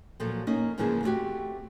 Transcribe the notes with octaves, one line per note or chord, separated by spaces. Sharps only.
A#2 F3 F#3 A4
A#3 C#4 D#4
G#2 C#3 E3 F3 A#3 G#4
A3 C4 D4 F#4 G4